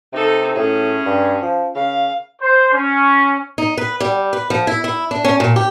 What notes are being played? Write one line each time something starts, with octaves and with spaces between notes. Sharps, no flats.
C3 D#4 A4
A2 C#4 G#4
G2
F3
C#3 F5
C5
C#4
D#4
B4
G3
B4
F3
E4
E4
D4
C#4
A#2
G4